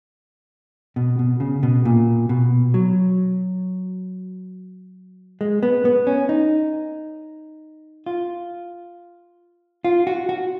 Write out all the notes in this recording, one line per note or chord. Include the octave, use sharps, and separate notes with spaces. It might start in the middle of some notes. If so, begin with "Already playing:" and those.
B2
B2
C#3
B2
A#2
B2
F#3
G#3
B3
B3
C#4
D#4
F4
F4
F#4
F#4